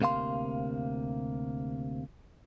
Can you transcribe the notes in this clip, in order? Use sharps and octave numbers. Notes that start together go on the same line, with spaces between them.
D2 C3 A#3 F5 C6